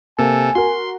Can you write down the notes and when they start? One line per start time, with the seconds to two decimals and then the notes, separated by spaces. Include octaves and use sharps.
0.19 C3 A#3 A4 G#5
0.55 F#4 A#4 C6